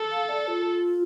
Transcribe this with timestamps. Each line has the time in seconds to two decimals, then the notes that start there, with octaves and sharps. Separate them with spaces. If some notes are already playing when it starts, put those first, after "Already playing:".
Already playing: A4
0.12 F5
0.29 D5
0.48 F4